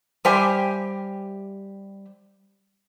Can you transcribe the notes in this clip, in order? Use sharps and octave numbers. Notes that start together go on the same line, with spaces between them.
G3 G4 C5 E5 G5 G#5